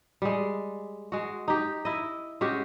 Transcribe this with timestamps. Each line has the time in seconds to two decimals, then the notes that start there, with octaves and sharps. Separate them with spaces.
0.22 G3 G#3
1.12 G#3 F#4
1.48 D#4 G4
1.85 E4 D#5
2.41 G#3 C#4 F#4 G4